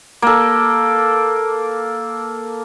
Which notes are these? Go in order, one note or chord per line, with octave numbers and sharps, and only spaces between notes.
A#3 A4